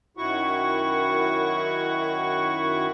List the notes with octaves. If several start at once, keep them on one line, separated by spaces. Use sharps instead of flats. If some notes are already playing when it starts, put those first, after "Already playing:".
F#2 D#3 E4 F#4 F#5 C#6